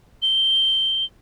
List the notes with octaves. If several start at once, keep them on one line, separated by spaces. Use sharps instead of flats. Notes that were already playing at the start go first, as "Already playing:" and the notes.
G7